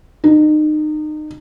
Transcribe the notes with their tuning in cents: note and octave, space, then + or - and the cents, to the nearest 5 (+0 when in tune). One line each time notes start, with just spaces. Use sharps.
D#4 -30